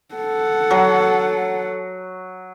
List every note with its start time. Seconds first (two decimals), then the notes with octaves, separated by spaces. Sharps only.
0.15 A4 F#5
0.70 F#3